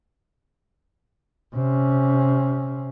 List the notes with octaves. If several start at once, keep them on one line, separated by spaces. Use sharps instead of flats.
C3 C#4